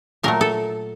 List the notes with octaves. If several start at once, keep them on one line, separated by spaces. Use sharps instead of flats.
A#2 F#3 A3 A#4
A4